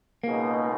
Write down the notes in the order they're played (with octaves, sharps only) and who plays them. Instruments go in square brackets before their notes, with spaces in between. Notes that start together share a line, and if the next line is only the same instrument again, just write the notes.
[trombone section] C#2 B2 G#3 D#4 [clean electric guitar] A#3